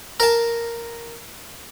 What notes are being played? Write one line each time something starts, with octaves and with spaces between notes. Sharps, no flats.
A#4 A5